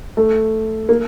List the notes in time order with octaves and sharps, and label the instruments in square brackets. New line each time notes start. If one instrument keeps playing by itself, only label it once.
[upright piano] A3
A#3